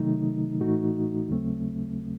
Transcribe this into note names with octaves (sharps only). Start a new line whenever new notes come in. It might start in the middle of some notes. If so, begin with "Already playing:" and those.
Already playing: C3 D#3 F#3 A3 D#4
A2 E3 A3 D#4 F#4
D#2 C#3 F#3 A3 C4